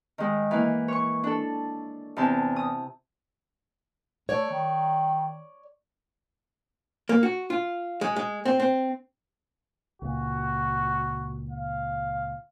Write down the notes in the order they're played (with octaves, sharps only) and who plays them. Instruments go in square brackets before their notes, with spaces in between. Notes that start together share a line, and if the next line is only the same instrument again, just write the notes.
[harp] D#3 G#3
E3 A#3
C#5 C#6
D4 A4
E2 C3 A5
D#6
[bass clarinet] A3 [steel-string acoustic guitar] C#5 D5
[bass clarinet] D#3
[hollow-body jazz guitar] A#3
F#4
F4
G#3
G#3
C4
C4
[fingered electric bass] C#2 A#2 [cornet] F#4
[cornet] F5